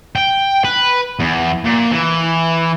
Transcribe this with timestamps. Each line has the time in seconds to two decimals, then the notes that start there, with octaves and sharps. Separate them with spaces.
0.16 G5
0.65 B4
1.19 E2
1.64 A#2
1.91 E3